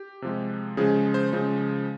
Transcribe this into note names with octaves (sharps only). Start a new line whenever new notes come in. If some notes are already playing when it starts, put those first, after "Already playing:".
Already playing: G4
C3 F3 G#3
C#3 F3 G#3 G#4
C5
C#3 F3 G#3